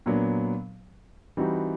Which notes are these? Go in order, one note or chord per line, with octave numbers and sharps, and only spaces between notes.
A#2 F#3 B3 D4
E3 G3 C4 D#4 F#4